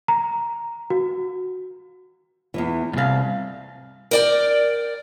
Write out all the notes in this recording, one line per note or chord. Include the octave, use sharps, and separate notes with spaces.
A#5
F#4
E2 G2 E3
C2 G#2 G#4 F5
A#4 D5 G5